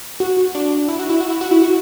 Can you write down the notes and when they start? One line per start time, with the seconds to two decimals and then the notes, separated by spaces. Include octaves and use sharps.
0.20 F#4
0.55 D4
0.88 E4
0.99 F#4
1.09 E4
1.21 F#4
1.30 E4
1.41 F#4
1.51 E4
1.62 F#4